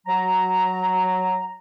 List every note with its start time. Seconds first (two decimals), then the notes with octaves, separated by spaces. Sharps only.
0.07 F#3 A#5